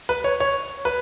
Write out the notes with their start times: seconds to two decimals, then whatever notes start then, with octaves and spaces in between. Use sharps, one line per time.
0.09 B4
0.24 C#5
0.40 C#5
0.85 B4